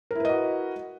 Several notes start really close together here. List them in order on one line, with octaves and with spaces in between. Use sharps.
A#4 E4 B4 D#5 F#4